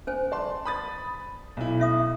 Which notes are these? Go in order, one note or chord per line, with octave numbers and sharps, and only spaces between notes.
C#4 C5 G#5
D5 A5 C6
B5 D#6 A6
B1 E4
C#4 E5 D#6